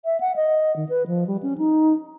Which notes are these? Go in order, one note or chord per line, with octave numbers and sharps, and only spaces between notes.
E5
F#5
D#5
D#3
B4
F3
G3
C#4
D#4